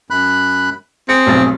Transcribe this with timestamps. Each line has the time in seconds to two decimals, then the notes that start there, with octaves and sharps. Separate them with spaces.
0.10 F#2 B5 F#6
1.09 C4 G#4 C#7
1.26 F1 B1 A6